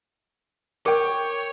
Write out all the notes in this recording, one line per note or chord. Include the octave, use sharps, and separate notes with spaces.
A#4 C5 C#5 G5 D6